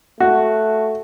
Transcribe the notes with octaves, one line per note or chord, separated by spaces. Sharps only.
A3 F#4